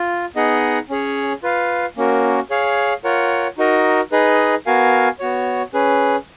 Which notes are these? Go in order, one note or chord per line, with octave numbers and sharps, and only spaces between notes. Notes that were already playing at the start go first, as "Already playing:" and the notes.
Already playing: F4
B3 D#4 G#4 D#5 F#5
C#4 G#4 C#5
F4 B4 F5
A#3 C#4 F#4 A#4
G#4 C#5 F5
F4 A#4 C#5 F#5
D#4 F#4 A#4 D#5
D#4 G#4 B4 D#5
B3 F#4 A#4 F5 G#5
B3 F#4 C#5
C#4 G#4 B4